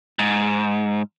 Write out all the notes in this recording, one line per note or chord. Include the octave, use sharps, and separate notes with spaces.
G#2